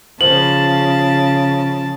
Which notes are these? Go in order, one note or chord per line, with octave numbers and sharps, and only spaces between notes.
C#3 F3 A5 F#7